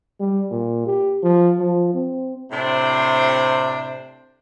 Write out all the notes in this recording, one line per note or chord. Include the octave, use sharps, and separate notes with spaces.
G3
A#2
G4
F3
F3
C4
A2 C3 D4 C5